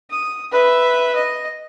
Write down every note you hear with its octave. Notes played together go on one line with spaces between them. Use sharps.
D#6
B4 E5
D#5